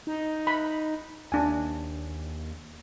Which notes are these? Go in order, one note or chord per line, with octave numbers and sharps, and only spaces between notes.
D#4
B5
D#2 D4 G#5